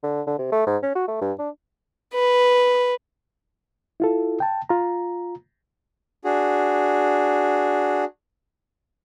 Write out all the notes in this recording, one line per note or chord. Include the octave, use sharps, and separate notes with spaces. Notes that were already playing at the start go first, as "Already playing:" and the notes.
D3
D3
C3
A3
G#2
C#4
F#4
A3
G2
D4
B4
E4 F4 A4
G5 A5
F4 A#5
D4 F#4 G#4